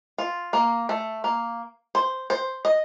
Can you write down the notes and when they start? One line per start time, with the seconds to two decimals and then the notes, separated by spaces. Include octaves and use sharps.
0.18 F4
0.53 A#3
0.89 A3
1.24 A#3
1.95 C5
2.30 C5
2.65 D#5